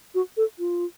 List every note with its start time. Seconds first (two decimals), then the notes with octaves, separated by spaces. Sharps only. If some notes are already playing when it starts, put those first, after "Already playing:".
0.15 F#4
0.37 A4
0.59 F4